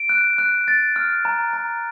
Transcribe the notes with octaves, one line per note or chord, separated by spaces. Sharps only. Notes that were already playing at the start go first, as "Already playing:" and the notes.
Already playing: D7
F#6
F#6
A6
F6
A#5
A#5